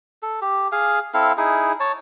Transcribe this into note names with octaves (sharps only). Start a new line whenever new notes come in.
A4
G4
G#4 F5
C4 E4 A4 F5
D#4 E4 G#4
C#5 A5